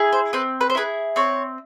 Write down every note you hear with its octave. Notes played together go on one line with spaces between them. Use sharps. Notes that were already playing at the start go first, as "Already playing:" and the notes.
Already playing: E4 G#4
C5
C4 B4
B4
C5
E4 G#4 B4
C4 C#5